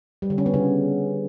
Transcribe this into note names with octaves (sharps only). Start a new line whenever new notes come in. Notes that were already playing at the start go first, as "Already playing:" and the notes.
G3
D3
C#4
B3
C#3